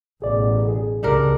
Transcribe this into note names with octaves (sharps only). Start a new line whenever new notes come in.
A1 B2 G#4 D5
G#4
C#2 G3 D4 A#4